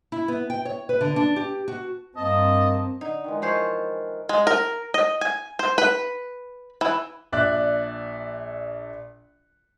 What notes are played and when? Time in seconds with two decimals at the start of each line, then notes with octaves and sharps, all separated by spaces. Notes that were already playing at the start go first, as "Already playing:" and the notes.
0.12 E4
0.28 B3
0.50 G5
0.65 C#5
0.89 B4
1.01 D3
1.16 D4
1.36 G4
1.68 F#4
2.16 G2 A#3 C4 D#5 A5
3.01 D3 D#4
3.24 D#3 E3 G#3
3.42 F3 A#4 C5 C#5
4.29 G#3
4.47 A#4
4.94 D#5
5.21 G#5
5.59 C5
5.78 B4
6.81 E3
7.32 A#1 D5 E5 F#6